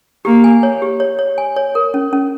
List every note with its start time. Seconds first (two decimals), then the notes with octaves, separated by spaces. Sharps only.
0.25 A#3 G4
0.44 G#5
0.63 C#5
0.82 G4
1.00 C#5
1.19 C#5
1.38 G#5
1.56 C#5
1.75 A#4
1.94 C#4
2.13 C#4